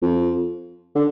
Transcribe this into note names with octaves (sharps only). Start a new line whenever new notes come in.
F2
D3